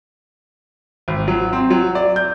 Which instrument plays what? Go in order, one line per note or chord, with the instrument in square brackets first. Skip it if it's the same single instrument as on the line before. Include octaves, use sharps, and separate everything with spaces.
[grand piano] G#1
F#3
C4
F#3
D5
G6